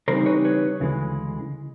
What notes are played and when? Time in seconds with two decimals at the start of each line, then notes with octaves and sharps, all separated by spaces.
0.08 C#3 E3 G3 C4 D#4 A#4 C5
0.26 B4 C#5
0.44 B4 C#5
0.80 D2 C#3 E3 G#3